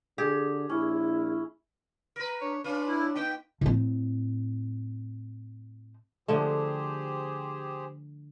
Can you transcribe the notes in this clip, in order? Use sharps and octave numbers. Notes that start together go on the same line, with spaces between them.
D3 G4 G#4
A#1 C#4 E4
A#4 B4
D4 C#5
C#4 D4 F4 B4
E4
A#3 D#4 G5
A2 C4
D3 F3 A3 G4 G#4 C5